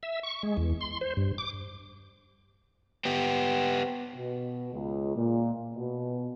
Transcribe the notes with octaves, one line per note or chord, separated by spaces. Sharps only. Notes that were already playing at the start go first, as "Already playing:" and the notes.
E5
C#6
G#3
E2
C6
C5
G2
D6
B3 G4
B2
C#2
A#2
B2